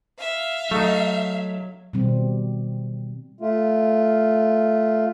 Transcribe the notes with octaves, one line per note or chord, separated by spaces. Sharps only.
E5 F5
F#3 A3 D#4
B2 D#3 G3 C4
A3 F4